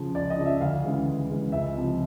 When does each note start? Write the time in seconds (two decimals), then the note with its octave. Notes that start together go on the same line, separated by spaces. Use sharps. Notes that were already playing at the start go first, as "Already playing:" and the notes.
Already playing: C#3 F3
0.15 C#2 D5
0.30 D#5
0.38 C#3 F3
0.46 E5
0.61 D2 F5
0.84 C#3 E3 G#3
1.07 D2
1.29 C#3 E3 G#3
1.52 C#2 E5
1.75 C3 F3